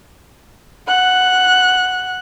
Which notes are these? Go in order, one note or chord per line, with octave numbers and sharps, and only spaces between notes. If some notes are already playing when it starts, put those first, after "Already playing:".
F#5 F#6